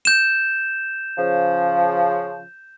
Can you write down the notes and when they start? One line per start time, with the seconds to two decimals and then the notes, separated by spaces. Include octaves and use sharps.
0.05 G6 E7
1.17 C#3 F3